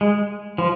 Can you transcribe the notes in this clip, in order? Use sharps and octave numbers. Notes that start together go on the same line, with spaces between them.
G#3
F3